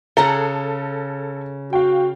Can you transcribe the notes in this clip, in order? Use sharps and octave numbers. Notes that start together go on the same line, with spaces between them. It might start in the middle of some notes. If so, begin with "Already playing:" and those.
C#3 G#4 A4 F#5 A#5
F#4 F5 G5